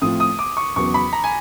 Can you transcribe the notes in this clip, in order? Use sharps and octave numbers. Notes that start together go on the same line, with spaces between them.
A2 F3 A3 C4 F4 D#6
D#6
D6
C#6
E2 C#3 F#3 B3 C#6
B5
A#5
G#5